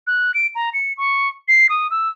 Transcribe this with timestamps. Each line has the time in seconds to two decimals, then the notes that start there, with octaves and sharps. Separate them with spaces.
0.07 F#6
0.34 D7
0.55 A#5
0.74 C#7
0.97 C#6
1.48 C7
1.69 D#6
1.91 E6